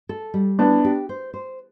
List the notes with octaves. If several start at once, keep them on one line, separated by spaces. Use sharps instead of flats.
A4
G3
B3 D4 E4
G4
C5
C5